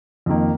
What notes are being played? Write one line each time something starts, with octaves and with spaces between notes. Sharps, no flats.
F2 D#3 A#3